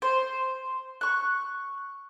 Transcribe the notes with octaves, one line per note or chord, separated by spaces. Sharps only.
C5
C#6 F#6